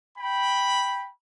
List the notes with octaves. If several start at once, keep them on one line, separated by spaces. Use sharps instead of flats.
G5 B5